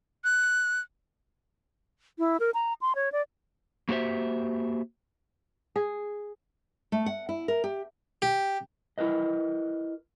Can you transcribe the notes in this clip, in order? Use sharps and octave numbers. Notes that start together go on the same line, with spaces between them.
F#6
E4
A#4
A#5
C6
C#5
D5
A#3 F#4 G4 C5 E5
G#4
A3
F#5
E4
A#4
G4
G4
E4 A#4 B4 D#5